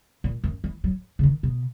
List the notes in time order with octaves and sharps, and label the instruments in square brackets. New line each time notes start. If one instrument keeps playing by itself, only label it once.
[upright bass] A#2
F#2
E3
F#3
C#3
D#3
B2